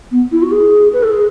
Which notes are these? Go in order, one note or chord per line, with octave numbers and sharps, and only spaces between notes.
B3
E4
F#4
G#4
B4
A4
G#4